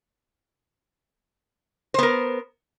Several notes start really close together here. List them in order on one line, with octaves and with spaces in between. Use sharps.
C5 B3 A#4